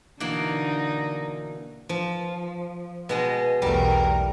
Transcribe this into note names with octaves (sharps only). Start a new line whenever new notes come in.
B2 D3 E3 A#3 D#4
F3
B2 G#3 D#5
B1 E2 G3 A3 A#4